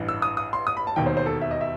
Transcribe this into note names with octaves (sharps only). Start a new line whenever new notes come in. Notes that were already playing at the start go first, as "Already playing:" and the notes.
Already playing: A1 G2 E3
E6
D#6
D#6
C6
D#6
B5
A5
E1 D#2 D#3 G5
C5
C5
A4
E5
D#5
E5